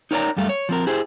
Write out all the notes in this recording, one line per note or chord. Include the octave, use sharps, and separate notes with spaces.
D#4 A#4 C#5 D5 A#5
F#2 G3 A3 F5
C#5
F3 C4 A#4
E4 G4 G#4 C5